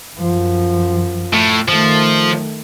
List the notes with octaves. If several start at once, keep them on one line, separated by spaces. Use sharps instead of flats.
F#2 F3
A2
D#3 F3 A3